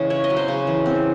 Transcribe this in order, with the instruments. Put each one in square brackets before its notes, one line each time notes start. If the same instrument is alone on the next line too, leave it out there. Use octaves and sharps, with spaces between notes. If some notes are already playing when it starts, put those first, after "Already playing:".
Already playing: [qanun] C#3 E3 G#3
E4 C#5
D#5
F#3
C5
C#3
E3
C4